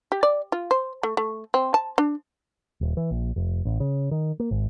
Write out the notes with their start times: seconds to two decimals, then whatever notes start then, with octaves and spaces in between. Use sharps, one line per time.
0.12 G4
0.23 D5
0.52 F4
0.71 C5
1.03 A3
1.17 A3
1.54 C4
1.74 A5
1.98 D4
2.81 D#1
2.97 E3
3.11 A#1
3.36 F1
3.65 A1
3.80 C#3
4.11 D#3
4.40 A#3
4.51 G#1